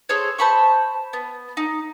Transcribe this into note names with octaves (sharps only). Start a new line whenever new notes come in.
G#4 A4 C5 C#5
C5 A5 B5 C#6
B3
D#4